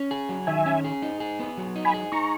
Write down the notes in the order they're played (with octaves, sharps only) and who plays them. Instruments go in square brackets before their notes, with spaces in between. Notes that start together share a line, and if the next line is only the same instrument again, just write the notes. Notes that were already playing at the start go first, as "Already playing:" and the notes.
Already playing: [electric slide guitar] C#4
G#4
F#3
[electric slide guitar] D#3 [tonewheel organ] E5 G#5
[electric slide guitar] C#4
G#4
D#4
G#4
B3
F#3
D#4
[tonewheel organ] G#5 B5
[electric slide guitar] G#4
[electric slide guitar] D#4 [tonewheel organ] A#5 C#6